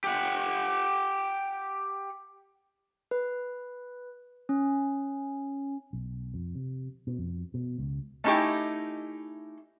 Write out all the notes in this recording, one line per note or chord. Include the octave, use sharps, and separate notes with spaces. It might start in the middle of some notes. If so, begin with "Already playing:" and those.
G4 F#5
B4
C#4
B1
F2
C3
B2
F2
B2
C#2
A3 C#4 D#4 E4 G4